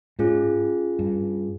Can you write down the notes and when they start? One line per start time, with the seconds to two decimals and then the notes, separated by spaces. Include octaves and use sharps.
0.19 G#2 C#4 F4 G#4
0.99 G2